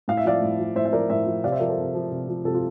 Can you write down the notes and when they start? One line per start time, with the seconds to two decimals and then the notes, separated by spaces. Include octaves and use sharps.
0.08 A2 F5
0.17 E5
0.25 F3 D5 F5
0.42 A2
0.59 F3
0.75 A2 C5 E5
0.85 E5
0.92 F3 A#4 D5
1.10 A2 C5 E5
1.26 F3
1.44 C3 D5 F5
1.52 C5 E5
1.60 F3 A#4 D5
1.69 A4 C5
1.78 C3
1.95 F3
2.11 C3
2.29 F3
2.44 C3 F4 A4
2.54 F4